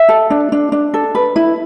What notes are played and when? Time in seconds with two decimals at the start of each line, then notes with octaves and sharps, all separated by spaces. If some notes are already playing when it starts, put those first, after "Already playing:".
Already playing: E5
0.09 A4
0.30 D4
0.52 D4
0.72 D4
0.94 A4
1.15 B4
1.36 E4